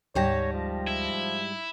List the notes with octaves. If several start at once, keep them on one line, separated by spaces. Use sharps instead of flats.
D2 G#2 G3 C#5 G5 A5 A#6
F3
E4